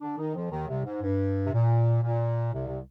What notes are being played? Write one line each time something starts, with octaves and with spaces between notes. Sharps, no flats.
D3 D4
D#3 D#4
F2 F3
D#2 D#3
C2 C3
G#2
G2
C3
A#2
A#2
C2 C3
C3